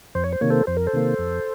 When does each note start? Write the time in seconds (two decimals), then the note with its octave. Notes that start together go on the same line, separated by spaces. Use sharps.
0.15 F2 C5
0.24 C#5
0.33 C5
0.41 C3 D#3 A#3 C#5
0.50 A4 C5
0.67 F2 C5
0.77 A#4
0.87 A4 C5
0.93 C3 D#3 A#3
1.19 F2